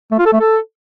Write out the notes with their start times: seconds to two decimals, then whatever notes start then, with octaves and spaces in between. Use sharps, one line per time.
0.11 A3
0.19 F4
0.26 A4
0.33 A3
0.40 A4